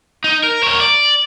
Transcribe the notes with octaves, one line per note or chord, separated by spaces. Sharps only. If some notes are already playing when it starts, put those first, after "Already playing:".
D#4
A#4
A#4 C#5
D5